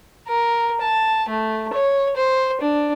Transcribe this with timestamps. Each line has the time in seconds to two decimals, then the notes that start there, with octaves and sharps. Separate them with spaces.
0.28 A#4
0.81 A5
1.29 A3
1.73 C#5
2.16 C5
2.61 D4